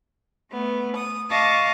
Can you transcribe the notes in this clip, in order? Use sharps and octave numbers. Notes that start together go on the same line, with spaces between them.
A3 B3
D#6
D#5 F5 A5 C#6 D6